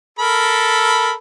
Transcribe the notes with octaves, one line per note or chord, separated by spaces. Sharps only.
A4 A#4 B5